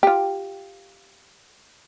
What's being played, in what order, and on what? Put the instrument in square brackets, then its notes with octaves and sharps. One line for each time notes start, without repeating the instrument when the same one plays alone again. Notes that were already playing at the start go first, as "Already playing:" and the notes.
[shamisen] F4 G4